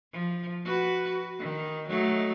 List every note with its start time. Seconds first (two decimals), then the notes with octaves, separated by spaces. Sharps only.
0.13 F3
0.65 F#4 B4
1.39 D#3
1.88 F#3 A3 D#4